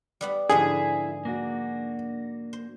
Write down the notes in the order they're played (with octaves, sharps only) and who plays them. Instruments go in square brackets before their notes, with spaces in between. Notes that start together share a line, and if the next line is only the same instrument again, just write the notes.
[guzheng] G3 B3 B5
[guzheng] G#2 D3 F3 [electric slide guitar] E4 [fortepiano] G#4
[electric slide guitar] A#3 D4 F#4
[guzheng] C5